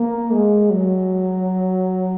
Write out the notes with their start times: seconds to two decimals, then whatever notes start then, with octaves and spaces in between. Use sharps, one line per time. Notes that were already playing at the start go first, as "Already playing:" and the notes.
Already playing: A#3
0.31 G#3
0.70 F#3